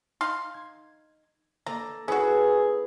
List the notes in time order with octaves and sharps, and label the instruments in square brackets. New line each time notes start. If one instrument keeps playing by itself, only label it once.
[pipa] D#4 F5 C6
[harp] G#6
[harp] A#3 A4 D5 [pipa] A#5
[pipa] C#4 F#4 [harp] E4 B4 E6 [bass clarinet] G#4